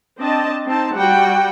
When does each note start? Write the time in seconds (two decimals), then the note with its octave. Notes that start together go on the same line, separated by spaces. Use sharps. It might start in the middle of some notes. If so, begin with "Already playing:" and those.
0.19 C4 D4 D#5 A5
0.65 C4 D#4 A5
0.95 G3 F#4 F#5 G5